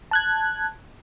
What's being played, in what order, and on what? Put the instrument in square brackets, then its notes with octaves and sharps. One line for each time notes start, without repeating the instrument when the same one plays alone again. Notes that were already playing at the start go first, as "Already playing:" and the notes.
[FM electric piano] A5 F#6 G#6